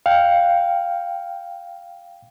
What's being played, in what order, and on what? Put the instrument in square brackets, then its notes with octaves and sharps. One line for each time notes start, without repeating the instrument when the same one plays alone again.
[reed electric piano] F5 G5